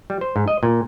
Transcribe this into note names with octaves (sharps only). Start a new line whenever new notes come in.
G3
C5
G#2
D#5
A#2